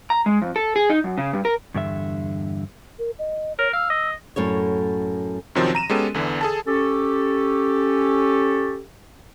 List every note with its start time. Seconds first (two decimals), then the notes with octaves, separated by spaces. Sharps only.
0.10 A#5
0.26 G#3
0.42 F2
0.56 A4
0.76 G#4
0.90 D#4
1.04 F#2
1.18 C#3
1.33 G2
1.45 A#4
1.74 E2 G2 D3 E5
2.99 A#4
3.19 D#5
3.58 A#4 C#5
3.73 F5 E6
3.90 D#5
4.36 F#2 A2 C#5
5.55 F#2 C3 D#3 F3 F#3 C4
5.75 A#5 D#7 E7
5.90 G#3 B3 C#4 G4 A4
6.14 E2 D3 E3
6.41 G#4 A4 A5
6.67 C#4 G4 A4